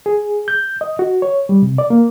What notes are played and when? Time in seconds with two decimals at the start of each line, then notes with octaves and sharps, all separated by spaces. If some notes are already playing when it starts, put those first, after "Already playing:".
0.06 G#4
0.48 G6
0.81 D#5
0.99 F#4
1.22 C#5
1.49 G3
1.62 C3
1.78 D5
1.90 A#3